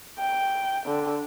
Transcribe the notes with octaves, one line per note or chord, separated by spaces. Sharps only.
G5
D3